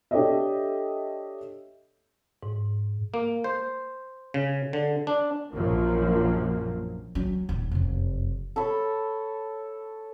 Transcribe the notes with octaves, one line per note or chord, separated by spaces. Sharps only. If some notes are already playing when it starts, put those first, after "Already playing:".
D4 G4 A4 C#5 D#5 E5
G#2
A#3
C5
C#3
D3
D4
A#1 F#2 F3 F#3 A#3
F#3 C#4
D#1
F1 F#2
A4 C#5 B5